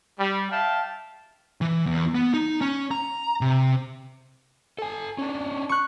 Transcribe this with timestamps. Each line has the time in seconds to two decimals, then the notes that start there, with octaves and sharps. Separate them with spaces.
0.19 G3
0.51 E5 F5 G5 A5
1.61 E3
1.86 E2
2.15 B3
2.34 D#4
2.61 C#4
2.91 A#5
3.41 C3
4.79 A4 G#5
5.18 C#4 D4
5.69 C#6 F#6